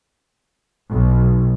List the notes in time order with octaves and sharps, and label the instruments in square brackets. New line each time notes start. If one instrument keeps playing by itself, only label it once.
[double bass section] B1